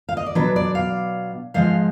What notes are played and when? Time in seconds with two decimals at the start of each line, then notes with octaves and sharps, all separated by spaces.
0.09 F5
0.17 D#5
0.26 D5
0.35 B2 F#3 D4 B4
0.56 D5
0.75 F5
1.54 G#2 F3 G#3 F5